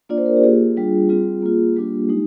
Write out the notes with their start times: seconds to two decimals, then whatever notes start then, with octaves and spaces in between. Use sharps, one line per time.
0.09 A#3 D4 F4 D5
0.18 C5
0.26 A#4
0.37 G4
0.44 A#3 F4 G#4
0.77 G3 D4 F4
1.09 G3 C4 F4 G#4
1.42 A#3 F4
1.76 G3 A#3 D4 F4 G4
2.09 G#3 D#4